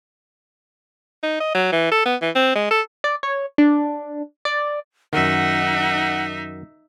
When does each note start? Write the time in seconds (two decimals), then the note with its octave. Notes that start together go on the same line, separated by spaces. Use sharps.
1.23 D#4
1.40 D#5
1.55 F#3
1.72 E3
1.92 A4
2.06 B3
2.22 E3
2.35 C4
2.55 G#3
2.71 A4
3.04 D5
3.23 C#5
3.58 D4
4.45 D5
5.13 F#2 D#3 D#4 E5 F#5